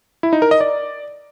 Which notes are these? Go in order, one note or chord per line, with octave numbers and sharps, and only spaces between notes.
E4
D#4
A#4
D#5
D5